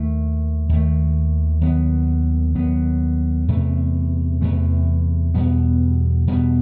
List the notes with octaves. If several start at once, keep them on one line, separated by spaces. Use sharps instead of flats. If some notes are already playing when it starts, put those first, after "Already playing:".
Already playing: D#2 D#3 A3
D#2 D#3 A3
D#2 D#3 F#3 B3
D#2 D#3 F#3 B3
E2 C3 E3 A3
E2 C3 E3 A3
E2 B2 G3 B3
E2 B2 G3 B3